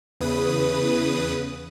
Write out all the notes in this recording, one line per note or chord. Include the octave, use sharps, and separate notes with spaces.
E2 C#3 B4 D#6